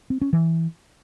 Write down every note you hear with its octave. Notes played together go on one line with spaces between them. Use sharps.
C4
C#4
E3